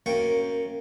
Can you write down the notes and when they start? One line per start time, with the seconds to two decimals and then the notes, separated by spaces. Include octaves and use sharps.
0.06 F#2 A#3 G5 C#6